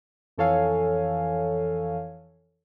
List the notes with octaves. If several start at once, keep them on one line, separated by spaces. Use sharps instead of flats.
F2 E3 A4 C#5 F5 G#5